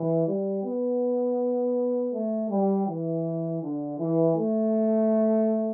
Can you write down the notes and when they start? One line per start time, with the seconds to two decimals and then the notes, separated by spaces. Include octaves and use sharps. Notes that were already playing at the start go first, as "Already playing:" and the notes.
Already playing: E3
0.27 G3
0.64 B3
2.13 A3
2.50 G3
2.87 E3
3.62 D3
3.98 E3
4.36 A3